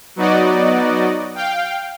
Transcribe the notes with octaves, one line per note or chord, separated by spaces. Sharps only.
F#3 B3 D#4 F#4 D5 D#5
F5 G5